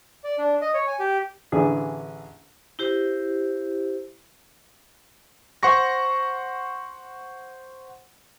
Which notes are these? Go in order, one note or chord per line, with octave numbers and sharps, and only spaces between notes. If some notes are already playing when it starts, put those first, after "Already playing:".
D5
D4
D#5
C#5
G#5
G4
A1 D3 E3 D4 G#4
E4 G4 C5
C5 F#5 C6 C#6 A#6